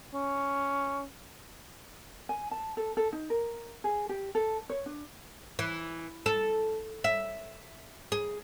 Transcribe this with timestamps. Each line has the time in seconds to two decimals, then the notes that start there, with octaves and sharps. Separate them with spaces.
0.14 C#4
2.29 G#5
2.51 A5
2.77 A4
2.97 A4
3.13 D#4
3.30 A#4
3.84 G#4
4.09 G4
4.35 A4
4.70 C#5
4.86 D4
5.59 E3
6.26 A4
7.04 E5
8.12 G#4